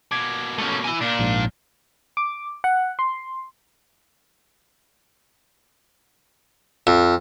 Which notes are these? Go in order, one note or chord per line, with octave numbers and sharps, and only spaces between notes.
B2 A#3 D6 G#6
A3 C#4
E4 G#5
A#2 D4
A#1 G#2
D6
F#5
C6
F2